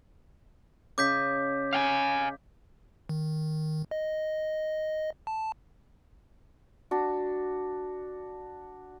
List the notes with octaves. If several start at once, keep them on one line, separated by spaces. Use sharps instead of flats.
C#3 D#5 D6 G6 B6
F5 G5 G#5
D#3
D#5
A5
D4 F#4